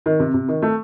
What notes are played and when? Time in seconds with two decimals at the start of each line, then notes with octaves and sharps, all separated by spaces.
0.06 D#3
0.20 C3
0.34 C3
0.48 D#3
0.62 A3